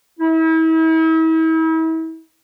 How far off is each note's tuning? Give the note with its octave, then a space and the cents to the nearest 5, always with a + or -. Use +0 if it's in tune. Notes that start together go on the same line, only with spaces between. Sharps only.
E4 -40